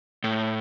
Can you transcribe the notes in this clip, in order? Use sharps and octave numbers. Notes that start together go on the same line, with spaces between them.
A2